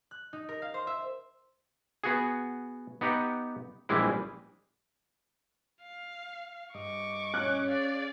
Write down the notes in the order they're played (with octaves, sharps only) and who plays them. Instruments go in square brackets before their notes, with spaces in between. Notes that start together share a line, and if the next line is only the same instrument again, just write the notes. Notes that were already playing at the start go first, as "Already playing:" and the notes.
[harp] F#6
D#4
A#4
F5
C5
E5
[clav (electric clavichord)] B3 F#4 G#4
B3 D#4 G4 F#5
A#1 E3 G3 G#3 E4 B4
[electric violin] F5
[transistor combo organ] G2 D#5 [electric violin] C#6 D6
[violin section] C#4 [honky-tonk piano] F#6
[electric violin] G#4 D5 [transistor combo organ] F5